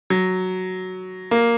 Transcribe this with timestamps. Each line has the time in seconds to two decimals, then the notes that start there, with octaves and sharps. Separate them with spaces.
0.10 F#3
1.31 A#3